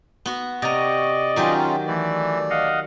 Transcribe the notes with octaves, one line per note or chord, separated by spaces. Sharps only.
B3 F#4
C3 D5 D#5 A#5 C#6
D#3 F#3 C#4 D#4 F4 G4
E3 A3 D5
D#5 F5 F#5